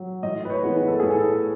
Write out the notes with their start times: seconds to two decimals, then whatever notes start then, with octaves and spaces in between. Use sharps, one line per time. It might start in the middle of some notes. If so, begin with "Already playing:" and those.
Already playing: F#3
0.23 A2 D#5
0.45 B4
0.50 C#5
0.63 E3 G#3 B3
0.77 B4
0.88 A4
1.00 A2 G#4
1.10 A4